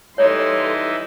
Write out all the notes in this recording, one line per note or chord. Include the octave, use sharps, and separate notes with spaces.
E3 G3 D#4 E4 A4 C#5 C6